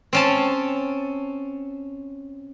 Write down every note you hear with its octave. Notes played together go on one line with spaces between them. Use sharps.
C4 C#4 A5